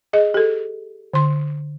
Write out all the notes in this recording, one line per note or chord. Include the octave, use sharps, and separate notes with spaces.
G#4 D#5
G4 A4
D3 C6